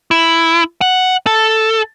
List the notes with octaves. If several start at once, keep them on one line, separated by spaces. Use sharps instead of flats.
E4
F#5
A4